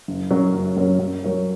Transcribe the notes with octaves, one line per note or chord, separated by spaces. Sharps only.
F#1
F#2 F#3 C#4 A#4
F#1
F#2 F#3 C#4 A#4
F#2
F#3 C#4 A#4